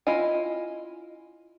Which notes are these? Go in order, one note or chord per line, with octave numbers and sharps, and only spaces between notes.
E4 F4 D#5 G#5